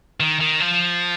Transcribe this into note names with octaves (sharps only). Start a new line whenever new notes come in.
D#3
D#3
F3